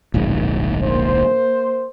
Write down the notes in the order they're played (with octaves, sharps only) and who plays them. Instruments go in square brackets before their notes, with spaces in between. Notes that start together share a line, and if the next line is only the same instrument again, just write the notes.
[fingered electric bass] D1 A#1 G#2
[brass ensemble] A#3 C5